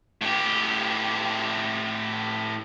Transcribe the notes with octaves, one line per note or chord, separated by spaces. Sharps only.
A2 G4